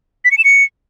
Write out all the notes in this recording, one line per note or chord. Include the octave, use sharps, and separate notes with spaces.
B6
C#7
E7
C#7